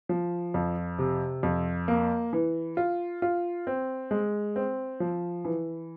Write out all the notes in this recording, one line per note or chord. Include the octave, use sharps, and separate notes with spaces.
F3
F2
C3
F2
A#3
E3
F4
F4
C4
G#3
C4
F3
E3